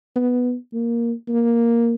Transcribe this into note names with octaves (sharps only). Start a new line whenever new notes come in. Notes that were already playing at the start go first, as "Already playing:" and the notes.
B3
A#3
A#3